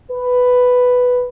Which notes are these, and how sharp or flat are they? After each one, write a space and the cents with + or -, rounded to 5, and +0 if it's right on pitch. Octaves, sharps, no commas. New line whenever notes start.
B4 +5